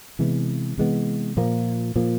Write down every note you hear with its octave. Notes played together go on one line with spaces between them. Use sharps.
C3 E3 G#3 B3
C3 E3 G#3 B3
A#2 F3 A#3
A#2 F3 A#3